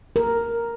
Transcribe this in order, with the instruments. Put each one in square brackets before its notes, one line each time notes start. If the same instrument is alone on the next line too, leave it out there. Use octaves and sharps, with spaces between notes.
[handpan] A#4